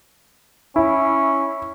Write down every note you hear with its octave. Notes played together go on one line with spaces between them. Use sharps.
C#4 E4